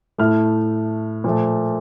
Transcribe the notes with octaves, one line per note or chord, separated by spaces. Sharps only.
A2 A3 F6
A#2 F3 A3